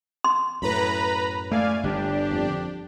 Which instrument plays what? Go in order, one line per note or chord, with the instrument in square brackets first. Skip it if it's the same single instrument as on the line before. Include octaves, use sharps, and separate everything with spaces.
[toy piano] C6
[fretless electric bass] F#2 A2 [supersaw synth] B4 A#5 B5
[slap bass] A3 [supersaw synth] D5 F5 G#5
[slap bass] G1 [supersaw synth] D4 G4
[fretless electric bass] F2